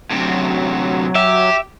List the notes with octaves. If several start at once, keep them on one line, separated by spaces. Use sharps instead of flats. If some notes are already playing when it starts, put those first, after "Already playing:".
D2 C3 F#3
G4 E5